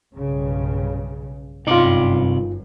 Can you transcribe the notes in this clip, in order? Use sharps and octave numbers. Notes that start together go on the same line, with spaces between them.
B1 G2 C#3
G1 F#2 C3 D#4 F4 D5